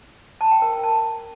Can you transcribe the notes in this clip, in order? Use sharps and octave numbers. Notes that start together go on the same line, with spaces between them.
A5
G5
A#4
A#5
A5